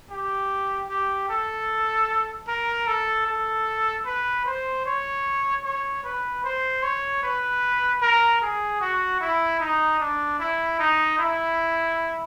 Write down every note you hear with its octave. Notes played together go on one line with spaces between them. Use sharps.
G4
G4
A4
A#4
A4
A4
B4
C5
C#5
C#5
B4
C5
C#5
B4
A#4
G#4
F#4
E4
D#4
D4
E4
D#4
E4